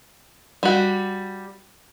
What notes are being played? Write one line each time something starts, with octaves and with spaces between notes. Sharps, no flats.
G3 F#4